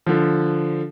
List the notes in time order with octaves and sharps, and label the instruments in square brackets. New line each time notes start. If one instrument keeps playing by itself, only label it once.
[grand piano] D3 F3